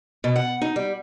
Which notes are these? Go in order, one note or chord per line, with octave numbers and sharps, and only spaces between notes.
B2
F#5
D#4
G3